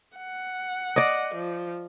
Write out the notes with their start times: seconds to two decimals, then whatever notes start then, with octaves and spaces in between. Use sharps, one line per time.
0.18 F#5
0.96 D5 D#5
1.35 F3